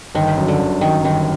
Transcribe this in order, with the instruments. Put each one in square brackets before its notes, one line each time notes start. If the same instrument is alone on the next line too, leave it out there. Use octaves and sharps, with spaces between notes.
[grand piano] G1 [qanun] D#3
[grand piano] F#2
[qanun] D3
[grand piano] G1
[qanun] D#3 [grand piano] F#3
[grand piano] G1 [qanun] D#3